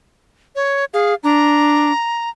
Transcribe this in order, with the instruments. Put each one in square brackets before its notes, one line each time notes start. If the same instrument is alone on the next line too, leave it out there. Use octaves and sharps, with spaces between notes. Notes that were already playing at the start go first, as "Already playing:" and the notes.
[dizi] C#5
[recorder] G#4 [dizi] F5
[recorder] D4 [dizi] A#5